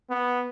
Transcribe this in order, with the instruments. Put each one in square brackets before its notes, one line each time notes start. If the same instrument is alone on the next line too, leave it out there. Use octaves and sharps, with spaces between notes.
[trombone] B3